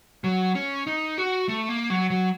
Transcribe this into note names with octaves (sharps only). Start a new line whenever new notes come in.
F#3
C#4
D#4
F#4
A3
A#3
F#3
F#3